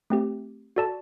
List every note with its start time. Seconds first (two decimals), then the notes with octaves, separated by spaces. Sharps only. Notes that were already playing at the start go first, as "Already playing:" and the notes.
0.10 A3 C4 G4
0.76 F#4 A4 D5 A5